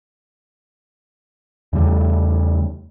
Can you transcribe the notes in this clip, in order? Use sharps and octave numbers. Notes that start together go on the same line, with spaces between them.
E2 C#3 G3 A3